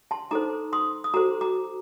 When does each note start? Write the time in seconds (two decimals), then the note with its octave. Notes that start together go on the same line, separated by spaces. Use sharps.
0.11 A5 C6
0.31 D#4 A4 C5 A#5 D6
0.73 C6 D#6
1.04 D#6
1.14 F#4 A4 C5 A#5 D6
1.41 A#5 D6